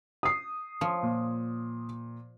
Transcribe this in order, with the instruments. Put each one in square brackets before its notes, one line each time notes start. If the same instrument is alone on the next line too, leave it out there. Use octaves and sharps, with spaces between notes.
[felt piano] D#6 C7
[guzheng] F3 C#5
[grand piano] A#2